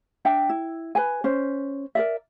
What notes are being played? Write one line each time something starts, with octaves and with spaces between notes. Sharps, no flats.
D4 E5 G5
E4
B4 G#5
C#4 C5
A#4 D5 E5